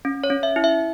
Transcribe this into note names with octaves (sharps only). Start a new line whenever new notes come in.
C#4
C#5
C#4
E5
E4
E5